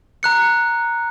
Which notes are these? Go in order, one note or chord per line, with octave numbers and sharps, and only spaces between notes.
A#5 F#6 C#7